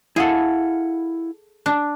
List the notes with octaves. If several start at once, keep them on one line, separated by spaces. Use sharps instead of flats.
E4 G#4 A4 F5 F#5
D4